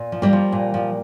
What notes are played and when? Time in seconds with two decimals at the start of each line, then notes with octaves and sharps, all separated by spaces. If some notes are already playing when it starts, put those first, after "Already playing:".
Already playing: A#2
0.12 F3
0.22 G3 A#3
0.33 F3
0.52 A#2
0.74 F3